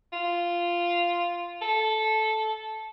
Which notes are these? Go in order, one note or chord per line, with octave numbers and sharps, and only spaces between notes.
F4
A4